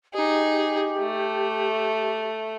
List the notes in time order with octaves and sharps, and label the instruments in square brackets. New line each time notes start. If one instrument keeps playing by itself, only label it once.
[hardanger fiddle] D#4 G#4 [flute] G4
[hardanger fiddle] A3